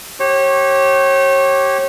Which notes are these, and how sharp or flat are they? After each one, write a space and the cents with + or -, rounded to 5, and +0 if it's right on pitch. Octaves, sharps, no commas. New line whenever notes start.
G4 -25 C#5 -30